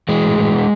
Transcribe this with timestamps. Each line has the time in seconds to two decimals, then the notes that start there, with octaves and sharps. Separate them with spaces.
0.09 E3 G#3
0.24 A2
0.39 E3
0.54 B2